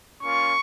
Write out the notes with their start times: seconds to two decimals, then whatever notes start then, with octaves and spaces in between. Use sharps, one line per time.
0.22 A#3 C#4 F4 C#6